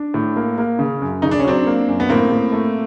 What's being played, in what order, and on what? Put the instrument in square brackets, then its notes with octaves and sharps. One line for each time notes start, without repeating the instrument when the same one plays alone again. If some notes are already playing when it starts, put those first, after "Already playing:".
Already playing: [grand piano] D4
A2
A#3
A#3
C#3
F#2
[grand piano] C#3 [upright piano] D#4
[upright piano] D4
C#4
[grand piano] F#3 [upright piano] C4 D4
[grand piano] A#3
F#2
[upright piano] B3
[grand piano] A2 [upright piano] A#3 C4
[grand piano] A2
A3